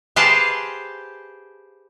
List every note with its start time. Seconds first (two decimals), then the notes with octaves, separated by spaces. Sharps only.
0.16 G4 G#4 B4 C5 F5 A5